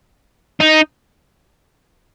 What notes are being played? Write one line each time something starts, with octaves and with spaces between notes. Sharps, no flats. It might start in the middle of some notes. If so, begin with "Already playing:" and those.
D#4